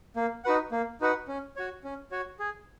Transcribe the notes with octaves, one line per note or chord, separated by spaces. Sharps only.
A#3
D#4 F#4 B4 F#5
A#3
D#4 F#4 B4 F#5
C#4
F#4 C#5
C#4
F#4 C#5
G#4